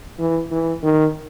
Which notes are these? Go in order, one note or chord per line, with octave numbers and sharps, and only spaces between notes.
E3
E3
D#3